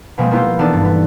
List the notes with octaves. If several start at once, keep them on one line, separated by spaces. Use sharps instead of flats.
B2 F3 G3 G#3 A#3 C4
A#3 B3 E4 F4 G4
E3 B3 D4 D#4 A4 D5
G2
B3